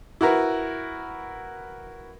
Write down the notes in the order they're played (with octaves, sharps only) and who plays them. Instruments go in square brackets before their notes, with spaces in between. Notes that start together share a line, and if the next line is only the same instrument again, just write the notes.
[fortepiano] E4 F#4 A#4 B4